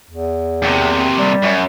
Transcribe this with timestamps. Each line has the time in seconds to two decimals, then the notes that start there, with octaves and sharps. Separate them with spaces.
0.11 E2
0.63 D#2 C3
1.18 G3
1.43 F#2